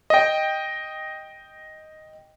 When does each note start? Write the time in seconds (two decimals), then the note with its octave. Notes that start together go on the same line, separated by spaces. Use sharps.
0.10 D#5 G5